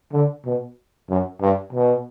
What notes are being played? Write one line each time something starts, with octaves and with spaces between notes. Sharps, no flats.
D3
B2
F#2
G2
B2